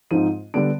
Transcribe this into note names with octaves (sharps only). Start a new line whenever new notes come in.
G#2 F3 C4 D#4 D#7
D3 G3 B3 D4 D7